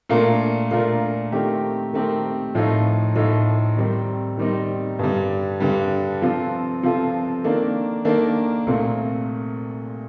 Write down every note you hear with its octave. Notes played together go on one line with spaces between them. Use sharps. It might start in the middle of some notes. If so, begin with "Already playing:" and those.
A#2 A3 D4 F4 A#4
A#2 A3 D4 F4 A#4
D#3 A3 C4 G4 A#4
D#3 A3 C4 G4 A#4
A2 F3 A3 D#4
A2 F3 A3 D#4
D#3 G3 C4 D#4
D#3 G3 C4 D#4
G2 D3 G3
G2 D3 G3
C3 F3 C4 F4 A4
C3 F3 C4 F4 A4
D#3 A#3 D4 A4
D#3 A#3 D4 A4
C2 A#2 A3 C4